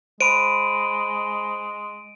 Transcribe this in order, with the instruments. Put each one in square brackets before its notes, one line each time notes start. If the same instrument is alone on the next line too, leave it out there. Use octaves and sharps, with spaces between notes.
[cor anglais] G#3 [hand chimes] C5 B5 [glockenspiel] D7 D#7